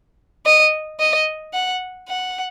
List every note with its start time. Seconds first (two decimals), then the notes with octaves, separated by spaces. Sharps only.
0.46 D#5
1.00 D#5
1.54 F#5
2.08 F#5